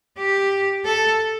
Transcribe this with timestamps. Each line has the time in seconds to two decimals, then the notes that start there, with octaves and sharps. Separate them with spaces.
0.17 G4
0.85 A4